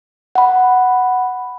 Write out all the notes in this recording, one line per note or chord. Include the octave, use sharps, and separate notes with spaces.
F#5 B5